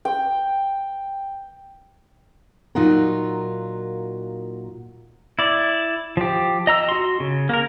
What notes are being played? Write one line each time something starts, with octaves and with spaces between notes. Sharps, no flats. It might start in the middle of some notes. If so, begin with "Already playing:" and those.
G5
A#2 F#3 D#4 F4 F#4 A#4
E4 D5
F3 G4
D#5 A#5 E6
F#4 C6
C#3
A#3 A#4